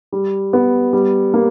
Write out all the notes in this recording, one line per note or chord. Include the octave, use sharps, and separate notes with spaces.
G3
B3
G3
A#3